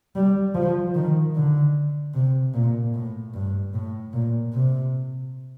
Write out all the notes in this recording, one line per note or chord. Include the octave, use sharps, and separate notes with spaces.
G3
F3
D#3
D3
C3
A#2
A2
G2
A2
A#2
C3